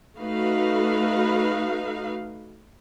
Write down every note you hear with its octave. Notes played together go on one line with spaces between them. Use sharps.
A3 D#4 F#4 B4 F5